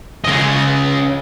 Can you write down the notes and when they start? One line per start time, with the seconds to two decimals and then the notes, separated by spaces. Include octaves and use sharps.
0.24 C#3 D#5